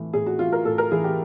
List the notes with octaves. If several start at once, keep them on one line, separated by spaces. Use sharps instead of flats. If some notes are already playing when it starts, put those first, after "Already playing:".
Already playing: A2 E3
A2 G#4
F#4
E3 F4
A#4
A2 A4
A#4
E3 G#4
G4